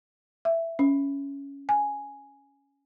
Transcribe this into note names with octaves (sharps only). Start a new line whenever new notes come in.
E5
C#4
G#5